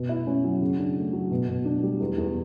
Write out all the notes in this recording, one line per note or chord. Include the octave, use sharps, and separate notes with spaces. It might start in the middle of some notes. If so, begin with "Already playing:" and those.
Already playing: B2
E4
C#4
F#3
C#3
D4
A3
F#3
B2
B2
D4
G3
E2
E2